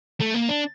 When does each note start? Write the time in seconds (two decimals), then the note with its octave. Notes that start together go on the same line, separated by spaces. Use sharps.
0.21 A3
0.34 A#3
0.49 D4